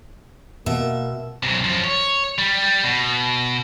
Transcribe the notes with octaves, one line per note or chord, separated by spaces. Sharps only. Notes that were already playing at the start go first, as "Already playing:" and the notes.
B2 A#3 E5
B1 C3
F#2 F3
C#5
G3
B2